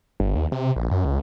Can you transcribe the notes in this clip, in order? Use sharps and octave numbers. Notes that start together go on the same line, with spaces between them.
G1
D#2
C3
A#1
F#2
C#2